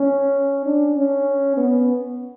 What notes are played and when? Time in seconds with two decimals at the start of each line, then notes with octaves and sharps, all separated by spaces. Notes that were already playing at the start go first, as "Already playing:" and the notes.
Already playing: C#4
0.66 D4
0.96 C#4
1.57 B3